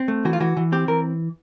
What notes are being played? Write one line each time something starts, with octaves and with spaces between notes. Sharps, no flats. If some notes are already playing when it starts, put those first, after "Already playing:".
Already playing: C4
A3
E3 F#4
F4
E3 F#4
E3
C4 G4
E3 A#4